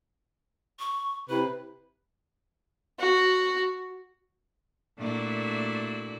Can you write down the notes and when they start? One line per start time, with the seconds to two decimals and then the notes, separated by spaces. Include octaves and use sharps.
0.79 C#6
1.30 C3 E4 B4
2.99 F#4
4.99 A#2 A3 D4 E4 F#4